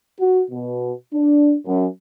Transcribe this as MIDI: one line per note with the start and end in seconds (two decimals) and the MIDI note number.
0.19 0.45 66
0.51 0.92 47
1.14 1.55 62
1.66 1.87 42